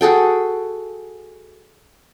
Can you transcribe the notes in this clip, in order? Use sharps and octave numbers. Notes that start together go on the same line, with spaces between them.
F#4 G#4 A4 G5